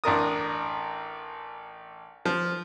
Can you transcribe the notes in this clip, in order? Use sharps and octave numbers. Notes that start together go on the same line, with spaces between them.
A1 D4 A#4 D#6
F3